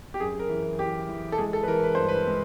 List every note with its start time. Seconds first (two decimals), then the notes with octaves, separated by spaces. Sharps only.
0.14 G4
0.20 F#2 G#4
0.39 A#4
0.50 E3
0.79 E3 G4
1.09 E3
1.32 A4
1.38 G#3 G#4
1.53 A4
1.63 B4
1.68 E3 A#4
1.84 B4
1.95 G2 C5
2.08 B4
2.27 G#3